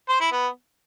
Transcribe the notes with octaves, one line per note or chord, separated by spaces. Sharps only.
C5
E4
B3